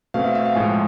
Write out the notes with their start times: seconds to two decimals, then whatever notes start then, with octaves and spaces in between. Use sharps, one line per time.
0.14 B2 A3 C4 F5
0.24 E5
0.35 E5
0.45 F5
0.55 A2 F3 G#3 G#5